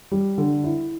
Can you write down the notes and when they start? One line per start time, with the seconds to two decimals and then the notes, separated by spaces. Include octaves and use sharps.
0.11 G3
0.38 D3
0.64 E4